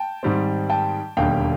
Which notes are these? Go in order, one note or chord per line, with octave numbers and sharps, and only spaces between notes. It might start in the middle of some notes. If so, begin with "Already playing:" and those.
Already playing: G5 A5
G#2 D#3 G3 C4
G5 A5
E1 D#2 D3 G3 F5 G5